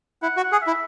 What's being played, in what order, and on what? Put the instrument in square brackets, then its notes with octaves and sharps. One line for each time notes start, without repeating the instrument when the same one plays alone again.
[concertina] E4 [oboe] F#5
[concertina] F#4
[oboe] F#5
[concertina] G#4
[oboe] E5
[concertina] E4